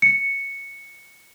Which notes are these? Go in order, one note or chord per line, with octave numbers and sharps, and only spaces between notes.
C#7